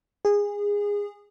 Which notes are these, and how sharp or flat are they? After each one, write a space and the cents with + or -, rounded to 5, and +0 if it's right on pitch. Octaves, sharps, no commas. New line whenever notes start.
G#4 -20